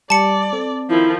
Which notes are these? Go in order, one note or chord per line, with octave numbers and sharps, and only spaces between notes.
G3 D5 A5 C#7
C4 A4
D#3 F3 E4